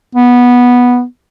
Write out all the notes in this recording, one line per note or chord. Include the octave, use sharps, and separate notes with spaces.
B3